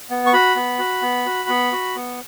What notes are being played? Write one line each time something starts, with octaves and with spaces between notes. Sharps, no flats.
B3
C#6
F#4 B5
B3
F#4
B3
F#4
B3
F#4
B3